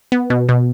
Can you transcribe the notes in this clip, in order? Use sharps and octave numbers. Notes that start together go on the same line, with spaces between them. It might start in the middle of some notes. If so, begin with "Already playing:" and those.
B3
B2
B2